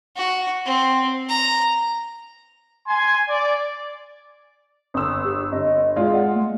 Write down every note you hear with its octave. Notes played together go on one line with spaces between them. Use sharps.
F#4
C4
A#5
G#5 C6
D5
G1 D#6 E6
G4
G1 D#5
G#3 F4 D5
F#5
A3